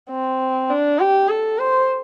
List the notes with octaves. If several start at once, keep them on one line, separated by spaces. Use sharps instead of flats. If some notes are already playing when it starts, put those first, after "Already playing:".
C4
D4
G4
A4
C5